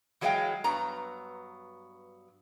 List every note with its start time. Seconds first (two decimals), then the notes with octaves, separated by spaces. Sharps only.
0.21 E3 F#3 G#3 C#5 F5 G5
0.64 G2 F#3 B3 A#5